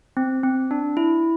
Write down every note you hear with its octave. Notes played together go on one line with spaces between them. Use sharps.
C4
C4
D4
E4